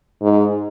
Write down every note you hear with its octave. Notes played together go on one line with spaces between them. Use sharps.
G#2